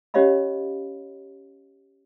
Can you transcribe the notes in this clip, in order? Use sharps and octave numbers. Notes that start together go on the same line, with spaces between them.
C#4 G4 C#5 D#5 F5 B5